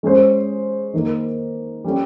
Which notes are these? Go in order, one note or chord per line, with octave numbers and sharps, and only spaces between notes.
G#3 C#4 G#4 C5
D#3 A#3 D#4 A#4
G3 C#4 G4